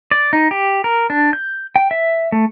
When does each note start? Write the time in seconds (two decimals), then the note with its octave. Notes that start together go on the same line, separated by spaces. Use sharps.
0.11 D5
0.33 D#4
0.51 G4
0.84 A#4
1.10 D4
1.33 G6
1.76 G5
1.91 E5
2.32 A3